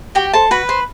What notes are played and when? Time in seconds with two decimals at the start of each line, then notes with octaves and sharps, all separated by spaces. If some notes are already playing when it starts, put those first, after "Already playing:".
0.15 F#4 G4 G5
0.33 A4 C5 A5
0.51 F#4 B4 B5
0.69 C5